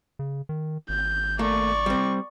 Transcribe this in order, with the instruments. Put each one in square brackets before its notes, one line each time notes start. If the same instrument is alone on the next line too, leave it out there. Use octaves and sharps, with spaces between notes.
[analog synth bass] C#3
D#3
[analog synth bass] G#1 [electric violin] G6
[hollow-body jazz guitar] A3 A#3 [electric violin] D5 C#6
[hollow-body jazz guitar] G3 C4